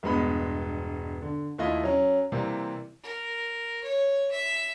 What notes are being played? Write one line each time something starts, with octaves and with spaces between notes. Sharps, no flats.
E1 G2 G#3 B3 D#5 B5
D3
D#2 A3 E4 F4 D#5
F#3 C#4
C3 E3 G3 A#3 C4
A#4
C#5
E5